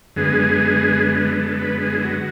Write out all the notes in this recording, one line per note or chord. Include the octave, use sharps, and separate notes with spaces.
F#2 D3 G#3 B3 G#4
A4
B4
G#4
E4
F#4